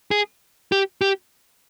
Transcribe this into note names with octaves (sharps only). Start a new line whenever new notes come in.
G#4
G4
G4